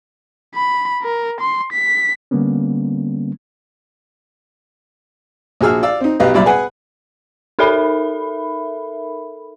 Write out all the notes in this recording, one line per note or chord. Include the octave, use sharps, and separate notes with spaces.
B5
A#4
C6
B6
D3 G3 A#3 B3 C#4
A#1 F#4 G#4 E6 F6
D5 F5 E6
C4 D#4
B1 G4 B4 D#5 F5
C2 F#2 A#2 D5 E5 B5
G#4 B4 F#5 G#5
D#4 A4 A#4 E5 B5